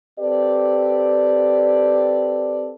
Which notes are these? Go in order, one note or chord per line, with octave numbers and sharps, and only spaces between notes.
C4 G4 A4 B4 D5